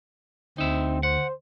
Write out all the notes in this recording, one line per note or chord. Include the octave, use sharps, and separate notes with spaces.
D2 C4 D#4 E5
C5 F#5